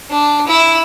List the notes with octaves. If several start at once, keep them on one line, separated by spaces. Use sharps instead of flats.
D4
E4